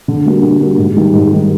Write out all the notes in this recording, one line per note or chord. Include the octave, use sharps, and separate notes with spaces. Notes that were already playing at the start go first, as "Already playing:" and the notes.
D3
G3 A#3 D4 F#4
D3
G3 A#3 D4 F#4
G#2
D#3 G3
G#2
D#3 G3